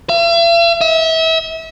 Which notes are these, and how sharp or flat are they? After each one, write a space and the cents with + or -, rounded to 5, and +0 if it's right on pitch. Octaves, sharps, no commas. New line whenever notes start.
E5 +45
E5 -30